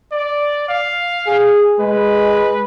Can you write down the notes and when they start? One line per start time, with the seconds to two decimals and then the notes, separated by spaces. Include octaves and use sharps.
0.12 D5
0.69 F5
1.27 G#4
1.79 G#3 B4